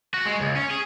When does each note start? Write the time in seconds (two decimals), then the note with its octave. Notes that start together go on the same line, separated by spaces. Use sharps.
0.14 F#4
0.26 G#3
0.41 C#2
0.56 C#4
0.71 G#4